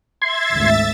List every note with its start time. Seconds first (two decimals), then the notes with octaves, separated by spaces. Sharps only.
0.22 E5 C6 G#6 A6
0.53 G#1 D2